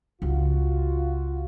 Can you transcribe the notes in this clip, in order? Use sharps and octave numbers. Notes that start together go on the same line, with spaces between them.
C#2 F4 F#4